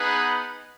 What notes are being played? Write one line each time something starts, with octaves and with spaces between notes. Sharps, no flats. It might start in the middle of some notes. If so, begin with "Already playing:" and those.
Already playing: B3 D#4 G#4 B4 F#5